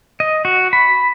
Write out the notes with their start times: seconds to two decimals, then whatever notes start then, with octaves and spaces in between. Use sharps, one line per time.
0.20 D#5
0.45 F#4
0.73 B5